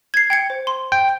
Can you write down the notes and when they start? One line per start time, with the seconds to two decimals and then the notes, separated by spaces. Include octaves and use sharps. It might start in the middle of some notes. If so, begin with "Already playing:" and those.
0.14 G#6 C7
0.30 G5 G#6 C#7
0.50 C5
0.67 C6
0.92 G5